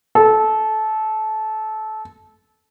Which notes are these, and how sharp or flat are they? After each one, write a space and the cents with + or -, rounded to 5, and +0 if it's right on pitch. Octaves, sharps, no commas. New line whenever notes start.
A4 -20